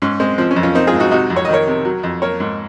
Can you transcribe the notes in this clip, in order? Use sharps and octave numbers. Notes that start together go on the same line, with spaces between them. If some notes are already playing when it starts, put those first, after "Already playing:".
G#2 C#4
G#3 C4
F3 C4
C#4
F2
C#4 F4
A#3 C4 D#4
F4 G#4
G#2
D#4 F#4
C3 D#4 F#4
F2
C#5
D#5
D#3 A#4 C#5
C3
F#3
F2
A#3 A#4 C#5
G#2